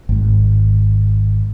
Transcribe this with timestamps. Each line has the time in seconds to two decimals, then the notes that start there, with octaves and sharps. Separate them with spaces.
0.09 G#1 G#2